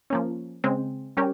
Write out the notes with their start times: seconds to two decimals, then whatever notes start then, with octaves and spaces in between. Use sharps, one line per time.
0.10 F3 A#3 C#4
0.64 C#3 G#3 C4
1.17 G3 C#4 G4 A#4